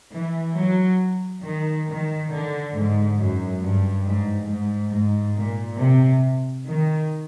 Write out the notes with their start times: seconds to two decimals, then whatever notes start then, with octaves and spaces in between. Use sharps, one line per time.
0.13 E3
0.56 F#3
1.43 D#3
1.86 D#3
2.29 D3
2.73 G#2
3.17 F#2
3.60 G2
4.04 G#2
4.46 G#2
4.90 G#2
5.34 A#2
5.78 C3
6.64 D#3